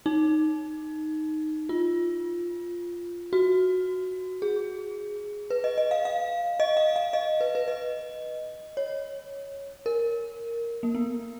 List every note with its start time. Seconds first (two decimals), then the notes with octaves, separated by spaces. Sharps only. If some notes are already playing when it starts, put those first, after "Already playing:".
0.06 D#4
1.69 F4
3.33 F#4
4.42 G#4
5.50 B4
5.64 D#5
5.78 D#5
5.91 F5
6.05 F5
6.60 D#5
6.77 F5
6.96 F5
7.13 D#5
7.41 B4
7.55 B4
7.68 D#5
8.77 C#5
9.86 A#4
10.83 A#3
10.95 B3